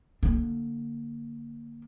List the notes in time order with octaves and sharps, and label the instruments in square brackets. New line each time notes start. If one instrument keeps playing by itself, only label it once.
[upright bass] D3 A#3